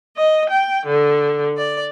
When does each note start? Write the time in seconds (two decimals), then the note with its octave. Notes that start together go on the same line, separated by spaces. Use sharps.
0.17 D#5
0.49 G5
0.86 D3
1.57 D5